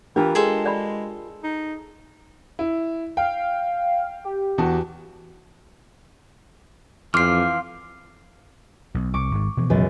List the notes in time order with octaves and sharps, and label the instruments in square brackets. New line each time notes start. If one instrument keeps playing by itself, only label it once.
[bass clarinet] E3 [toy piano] D4 [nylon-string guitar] F4 G4 A#4
[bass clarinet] G#3 [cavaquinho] G#4 A4 C5
[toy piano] D5 B5
[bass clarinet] D#4
[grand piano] E4
[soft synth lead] F5 [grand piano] G5
[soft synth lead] G4
[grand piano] E2 F#4 A5
[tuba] F2 [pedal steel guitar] E3 D6 [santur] F5 G5 C6 [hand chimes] F6 C7
[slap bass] B1
[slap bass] C2 [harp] C#6 D6
[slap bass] G#1 G#2
B2 E3 F3
[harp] C#2 F#2